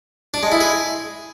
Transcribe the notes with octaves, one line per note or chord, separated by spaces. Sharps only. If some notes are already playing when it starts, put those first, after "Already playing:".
D4
G#3
E4
G#4